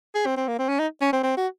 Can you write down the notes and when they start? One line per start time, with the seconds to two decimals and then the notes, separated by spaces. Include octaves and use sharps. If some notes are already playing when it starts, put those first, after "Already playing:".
0.15 G#4
0.26 C4
0.37 C4
0.48 A#3
0.59 C4
0.69 C#4
0.79 D#4
1.01 C#4
1.13 C4
1.23 C4
1.37 F#4